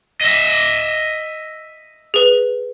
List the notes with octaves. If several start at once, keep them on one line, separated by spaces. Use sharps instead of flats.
D#5 E5
G#4 B4